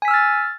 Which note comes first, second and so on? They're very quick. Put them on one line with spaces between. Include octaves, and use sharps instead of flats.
G#5 B6 E6 F6 A6